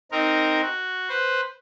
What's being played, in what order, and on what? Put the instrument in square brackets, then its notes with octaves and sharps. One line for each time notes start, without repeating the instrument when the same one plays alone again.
[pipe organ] C4 D#4 A#4
F#4
B4 C5